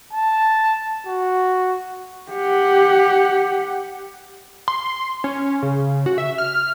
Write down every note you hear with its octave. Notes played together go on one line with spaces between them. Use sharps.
A5
F#4
G4 F#5
C6
C#4
C#3
F#4
E5
F6